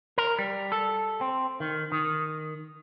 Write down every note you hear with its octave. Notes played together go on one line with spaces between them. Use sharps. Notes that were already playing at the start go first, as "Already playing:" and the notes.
A#4
G3
A4
C4
D#3
D#3